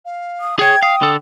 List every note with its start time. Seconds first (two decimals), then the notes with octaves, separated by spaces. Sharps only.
0.05 F5
0.40 D#6
0.59 G#4 C#5 G5 G#6
0.83 F5 D#6
1.02 D3 A4